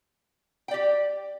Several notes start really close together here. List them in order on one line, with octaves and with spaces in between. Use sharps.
G5 D5 G4